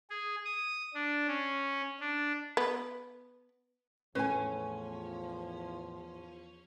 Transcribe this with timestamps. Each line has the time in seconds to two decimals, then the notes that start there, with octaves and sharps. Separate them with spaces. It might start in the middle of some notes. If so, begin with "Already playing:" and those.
0.10 G#4
0.45 D#6
0.94 D4
1.27 C#4
2.00 D4
2.57 B3
4.15 E2 A2 F3 A3 C#4 B4 G#5